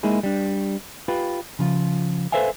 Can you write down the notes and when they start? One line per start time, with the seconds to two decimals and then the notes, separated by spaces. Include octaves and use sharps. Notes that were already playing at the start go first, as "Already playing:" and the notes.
0.03 G#3 A#3 D#4 E4 G#4
0.23 G3 D4
1.08 F4 G4 B4
1.59 C#3 F3 F4
2.32 A4 B4 C5 E5 F5 G#5